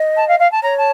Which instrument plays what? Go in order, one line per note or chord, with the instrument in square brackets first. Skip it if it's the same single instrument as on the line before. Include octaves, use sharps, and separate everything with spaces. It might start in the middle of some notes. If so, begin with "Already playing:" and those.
Already playing: [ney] D#5
[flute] A5
F5
F5
A5
[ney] C#5 [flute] A#5
[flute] A5